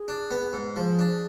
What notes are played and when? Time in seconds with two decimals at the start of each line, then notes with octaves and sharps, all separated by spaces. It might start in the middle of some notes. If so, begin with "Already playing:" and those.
Already playing: G#4
0.08 D4
0.31 B3
0.53 G#2
0.76 F3 G#4
0.99 D4